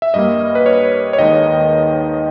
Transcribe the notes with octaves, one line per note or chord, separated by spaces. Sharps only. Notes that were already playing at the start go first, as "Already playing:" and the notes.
E5
G2 G3 A#3 D#5
B4
C#5
C#5
D#2 D#3 G#3 D#5